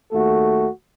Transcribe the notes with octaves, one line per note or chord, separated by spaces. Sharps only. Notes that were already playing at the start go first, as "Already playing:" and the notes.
D#2 A3 F#4 A4